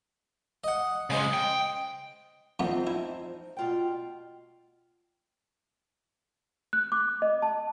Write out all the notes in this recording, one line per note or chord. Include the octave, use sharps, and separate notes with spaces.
D#5 F#5
C#3 G#3 C5 D#5 B5
G5
F2 E3 F3 B3 C4 D#4
E4
B2 F4 G5
F#6
D6
D#5
A5